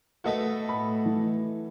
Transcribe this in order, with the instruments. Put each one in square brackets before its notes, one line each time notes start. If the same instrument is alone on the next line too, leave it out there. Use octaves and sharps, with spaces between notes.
[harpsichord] B2 A3 B4 [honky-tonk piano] F#4 A4 D#5
[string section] A2 [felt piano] B5
[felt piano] E3